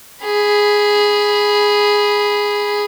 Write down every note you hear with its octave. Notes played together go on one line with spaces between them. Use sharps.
G#4 B5